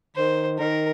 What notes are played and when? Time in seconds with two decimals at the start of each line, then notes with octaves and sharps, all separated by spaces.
0.16 D#3 C5
0.59 D#3 A#4